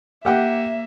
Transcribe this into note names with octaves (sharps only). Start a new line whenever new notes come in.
A#3 G4 E5 F#5 G5